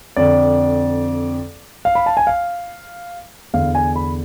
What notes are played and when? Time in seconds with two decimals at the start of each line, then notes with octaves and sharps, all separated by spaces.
0.16 F2 D3 D5
1.85 F5
1.95 B5
2.06 A5
2.17 G#5
2.27 F5
3.53 E2 D3 F5
3.75 G#5
3.96 B5